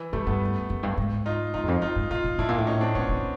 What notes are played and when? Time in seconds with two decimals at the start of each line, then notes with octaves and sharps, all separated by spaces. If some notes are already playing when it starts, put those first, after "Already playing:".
Already playing: E3
0.13 G#2 G3 A3
0.27 G2 A3 B3
0.70 F#2
0.83 G2
0.97 G#2
1.26 D#4 F4
1.54 G#2 D#4 F4
1.63 E2
1.68 F2
1.82 F#2 D#4 F4
1.96 G#2
2.10 B2 D#4 F4
2.24 A#2
2.39 A2 D4 E4
2.49 A#2
2.58 A2
2.67 C#4 D#4
2.81 C4 D4
2.95 A#2 B3 C#4
3.09 A#2